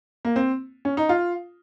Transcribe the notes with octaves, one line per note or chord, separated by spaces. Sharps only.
A#3
C4
C#4
D#4
F4